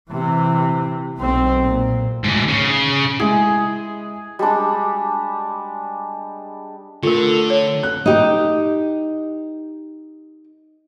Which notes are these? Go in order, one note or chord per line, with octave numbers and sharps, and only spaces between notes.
C3 E3
B1 C4
A#2
D2 G#2
C#3
G#3 E4 G#4
G3 G#3 D4
D3 A3 F4 A#4
C#5
F#6
D#4 G4